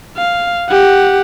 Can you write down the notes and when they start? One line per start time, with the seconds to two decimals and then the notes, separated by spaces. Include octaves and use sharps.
0.17 F5
0.69 G4 F#5